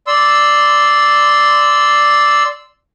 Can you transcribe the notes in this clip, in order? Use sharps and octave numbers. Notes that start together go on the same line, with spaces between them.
D5 C6 E6